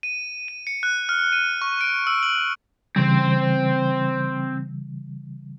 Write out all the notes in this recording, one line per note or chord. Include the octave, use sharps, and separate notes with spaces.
D#7
D#7
C#7
F#6
F6
D#7
C#6
D7
E6
F#7
C#3 E3 G3 C4 C5